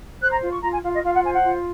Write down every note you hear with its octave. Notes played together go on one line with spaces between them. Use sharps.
C5 F#6
A#5
F4
C#6
F4 A#5
G#5
F4 F5
D#5
F4 F5
F#5
C5 G#5
F#5
F4